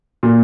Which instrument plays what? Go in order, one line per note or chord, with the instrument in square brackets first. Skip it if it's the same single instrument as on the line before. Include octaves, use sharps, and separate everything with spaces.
[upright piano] A#2